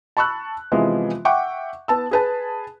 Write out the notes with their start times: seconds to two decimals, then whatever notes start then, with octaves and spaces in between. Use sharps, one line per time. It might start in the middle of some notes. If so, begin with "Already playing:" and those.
0.17 A5 B5 C#6 E6 F#6
0.72 C3 E3 F3 G#3 B3
1.25 E5 F#5 G5 C#6 D6
1.88 B3 A5 E6
2.11 G#4 B4 A5